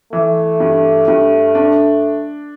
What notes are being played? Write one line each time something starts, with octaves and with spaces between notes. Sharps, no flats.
E3 A3
G2
G2
D4